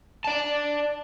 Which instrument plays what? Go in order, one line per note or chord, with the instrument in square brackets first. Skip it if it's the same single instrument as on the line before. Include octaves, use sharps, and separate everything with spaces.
[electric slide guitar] D5 A5